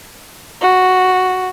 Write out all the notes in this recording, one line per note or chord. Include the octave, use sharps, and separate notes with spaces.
F#4